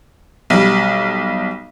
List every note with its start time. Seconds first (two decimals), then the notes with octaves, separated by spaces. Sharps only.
0.50 B1 G3